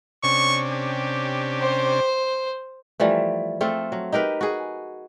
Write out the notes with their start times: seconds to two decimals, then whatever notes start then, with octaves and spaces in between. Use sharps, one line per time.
0.23 C3 C#4 D4 C#6
0.72 G4
1.62 C5
3.00 E3 F3 G3 A3
3.61 A3 C4 F4 A4
3.92 F#3
4.12 D#4 G4 A#4 B4
4.41 F#4 G#4